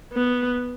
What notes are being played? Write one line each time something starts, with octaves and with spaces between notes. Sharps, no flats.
B3